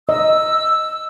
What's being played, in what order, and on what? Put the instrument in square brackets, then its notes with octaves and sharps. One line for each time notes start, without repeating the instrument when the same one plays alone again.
[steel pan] D#5 [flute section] E6